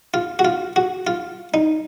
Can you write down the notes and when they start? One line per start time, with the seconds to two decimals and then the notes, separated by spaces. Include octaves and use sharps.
0.14 F4
0.39 F#4
0.45 F4
0.76 F#4
1.07 F4
1.54 D#4